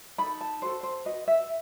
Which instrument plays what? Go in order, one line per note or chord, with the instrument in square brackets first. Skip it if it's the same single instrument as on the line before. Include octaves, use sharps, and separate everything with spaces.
[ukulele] D#4 A4 B5
A5
F#4 A4 C5
C5
F#4 B4 D#5
E5